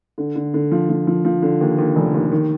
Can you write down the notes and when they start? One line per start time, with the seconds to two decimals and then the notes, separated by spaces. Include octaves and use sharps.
0.18 D3
0.36 D3
0.54 D3
0.72 F3
0.90 F3
1.07 F3
1.25 F3
1.42 D3
1.61 D#2
1.78 D#2
1.96 F1
2.14 D#2
2.32 D#3